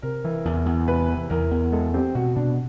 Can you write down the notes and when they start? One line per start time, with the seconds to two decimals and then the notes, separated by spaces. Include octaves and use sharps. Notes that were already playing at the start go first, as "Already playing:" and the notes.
0.02 C3 A#4
0.24 E3
0.45 E2
0.66 E2
0.87 C3 B4
1.09 E3
1.30 E2 A#4
1.51 E2
1.72 G#3 A4
1.94 C4 G4
2.15 B2 F#4
2.36 B2 D4